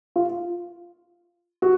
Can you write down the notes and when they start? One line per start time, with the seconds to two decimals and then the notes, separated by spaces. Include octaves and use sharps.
0.16 F4
1.62 F#4